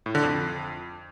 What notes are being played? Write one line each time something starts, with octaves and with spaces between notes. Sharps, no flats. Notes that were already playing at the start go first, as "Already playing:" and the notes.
A2
D3
F2